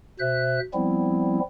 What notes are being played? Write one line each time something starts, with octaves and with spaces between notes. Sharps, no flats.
B2 C5 E5 F#6
F3 G3 B3 C4 E4